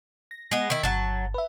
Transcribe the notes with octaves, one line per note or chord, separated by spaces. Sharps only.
A#6
G#3 B3
D#3 E4
G1 F#3 A5
B4 E5